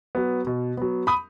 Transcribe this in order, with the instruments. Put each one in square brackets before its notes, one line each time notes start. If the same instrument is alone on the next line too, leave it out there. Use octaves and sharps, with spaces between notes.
[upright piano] F#3 B3
B2
F#3 B3
B5 D#6